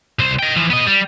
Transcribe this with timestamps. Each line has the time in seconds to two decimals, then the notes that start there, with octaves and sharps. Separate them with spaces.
0.19 C2 C5
0.39 D#5 G5
0.56 E3 F3
0.70 B3 D#5
0.87 G3